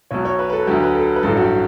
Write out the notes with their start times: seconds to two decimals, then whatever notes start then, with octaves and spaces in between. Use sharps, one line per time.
0.11 B1 B2 F#3 C#5
0.25 C#5
0.39 B4
0.50 B4
0.53 A4
0.67 D2 D3 F#3 G4
0.83 B4
0.95 A4
1.16 B4
1.23 A1 G2 F#3 A4
1.37 F#4
1.42 G4